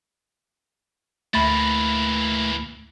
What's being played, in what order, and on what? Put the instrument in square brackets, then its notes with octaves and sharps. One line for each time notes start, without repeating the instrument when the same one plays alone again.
[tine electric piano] D2 B5 A6 [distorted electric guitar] E3 A#3 [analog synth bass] A3